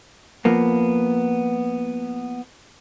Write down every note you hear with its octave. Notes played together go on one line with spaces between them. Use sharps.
F3 A#3 B3